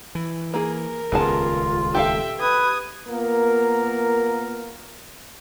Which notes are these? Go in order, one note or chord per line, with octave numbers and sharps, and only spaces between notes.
E3
A#3 G#4 A#4
D#1 C#2 C#3 B3 F4 G#4 A5
G4 A4 E5 F5 G5
B4 D#6 G#6
A#3 B3 F4 A#4